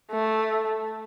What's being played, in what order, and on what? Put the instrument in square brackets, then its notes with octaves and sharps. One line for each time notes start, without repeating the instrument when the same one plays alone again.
[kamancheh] A3